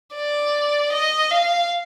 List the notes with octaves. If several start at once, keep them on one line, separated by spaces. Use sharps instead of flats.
D5
D#5
F5